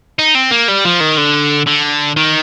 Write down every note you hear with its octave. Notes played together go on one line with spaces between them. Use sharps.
D#4
C4
A#3
G3
F3
D#3
D3
D3
D#3